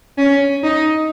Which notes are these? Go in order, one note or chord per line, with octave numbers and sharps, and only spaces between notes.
C#4
D#4